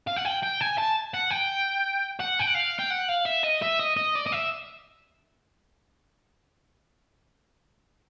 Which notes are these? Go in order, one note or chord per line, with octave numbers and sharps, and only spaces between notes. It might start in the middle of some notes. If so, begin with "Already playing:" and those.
F5
F#5
G5
G5
G#5
A5
F#5
G5
F#5
G5
F#5
F5
G5
F#5
F5
E5
D#5
E5
D#5
D#5
D5
D#5
E5